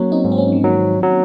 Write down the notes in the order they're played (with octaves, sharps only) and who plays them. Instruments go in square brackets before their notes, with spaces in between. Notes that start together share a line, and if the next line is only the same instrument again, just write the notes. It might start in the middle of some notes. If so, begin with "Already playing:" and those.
Already playing: [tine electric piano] F#3 [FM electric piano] A#3 C#4
[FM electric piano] C4 D#4
[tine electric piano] G#2
[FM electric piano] C4
A#3 C#4
F3
[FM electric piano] D#3 [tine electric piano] F#3
[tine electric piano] F#3